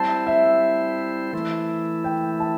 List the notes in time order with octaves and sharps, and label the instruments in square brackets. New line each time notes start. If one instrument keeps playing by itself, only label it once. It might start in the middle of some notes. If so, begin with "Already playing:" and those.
Already playing: [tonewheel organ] G3 C4 E4 C5 [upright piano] A5
[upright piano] E5
[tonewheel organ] E3 A3 E4
[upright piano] G5
A5